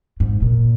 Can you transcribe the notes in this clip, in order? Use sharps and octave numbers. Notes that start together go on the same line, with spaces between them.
G#2
A#2